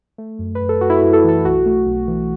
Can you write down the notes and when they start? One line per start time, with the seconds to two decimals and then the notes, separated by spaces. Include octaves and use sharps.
0.18 A3
0.39 F#2
0.55 B4
0.61 F#2
0.69 A4
0.81 F#2 F#4
0.90 E4
0.98 F#4
1.02 F#2
1.13 A4
1.24 E3 A4
1.45 B1 F#4
1.66 A3
1.87 B1
2.08 E3